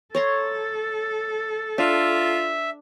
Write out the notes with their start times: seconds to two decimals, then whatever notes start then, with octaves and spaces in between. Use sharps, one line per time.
0.15 A4 C#5 A#5 C6
1.78 D4 F4 E5